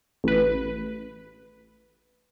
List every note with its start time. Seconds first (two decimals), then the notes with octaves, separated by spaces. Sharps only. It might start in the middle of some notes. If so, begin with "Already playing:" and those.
0.24 A1 B4